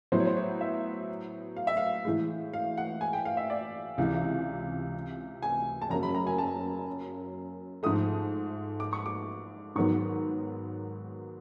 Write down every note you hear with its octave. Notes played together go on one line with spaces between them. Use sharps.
A2 F#3 B3 C5
C#5
C5
C#5
E5
F5
E5
F5
A2 E3 G#3
F5
F#5
G#5
G5
F5
E5
D5
C#2 C3 E3
G#5
A5
F#2 C#3 F#3 A#3 A#5
B5
A#5
G#5
A5
G#2 F3 A3 D#6
D6
C#6
D6
G#2 D#3 F#3 B3 C#6